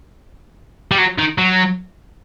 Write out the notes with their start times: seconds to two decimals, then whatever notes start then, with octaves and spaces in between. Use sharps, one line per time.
0.91 G3
0.98 F#3
1.18 D#3
1.38 F#3